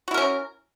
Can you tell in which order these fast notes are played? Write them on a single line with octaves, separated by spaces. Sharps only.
F#4 E4 A#4 C#4